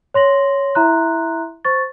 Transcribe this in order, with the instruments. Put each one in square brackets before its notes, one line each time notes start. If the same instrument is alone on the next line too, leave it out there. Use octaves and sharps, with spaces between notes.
[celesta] C#5 C6 A#6 F#7
E4 E5 A#5 C6 F#6
C5 C#6 A6